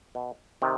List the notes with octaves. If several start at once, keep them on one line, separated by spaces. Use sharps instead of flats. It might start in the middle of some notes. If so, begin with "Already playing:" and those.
B2
C3 D#3